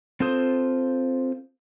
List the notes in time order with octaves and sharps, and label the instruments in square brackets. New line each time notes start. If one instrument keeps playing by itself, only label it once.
[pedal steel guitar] C4 F4 A4 C5 D#6